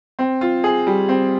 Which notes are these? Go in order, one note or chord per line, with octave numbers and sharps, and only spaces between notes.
C4
F4
G#4
G3
C4